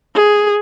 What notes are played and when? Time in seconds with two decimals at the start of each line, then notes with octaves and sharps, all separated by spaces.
0.15 G#4